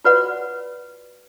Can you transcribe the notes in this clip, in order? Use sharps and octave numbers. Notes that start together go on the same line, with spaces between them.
F4 F#4 B4 C#5 D5 F#5